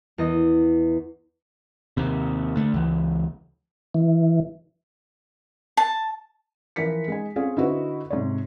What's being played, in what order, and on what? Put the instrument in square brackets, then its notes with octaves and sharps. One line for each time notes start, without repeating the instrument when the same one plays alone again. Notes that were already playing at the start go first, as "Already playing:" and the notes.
[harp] E2 D#5
[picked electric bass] D#2 C3
D3 A3
C#2 E3
[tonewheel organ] E3
[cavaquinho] A5
[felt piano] E3 F3 A#4 B6 C#7
G#3 D#4 G#5
C4 C#4 F4 G#4 F5
D3 D#4 E4 F#4 B4 C5
G#2 C3 C#5